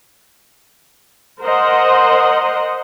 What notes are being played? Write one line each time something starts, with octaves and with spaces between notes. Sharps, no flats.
A#4 C5 D#5 F#5 C6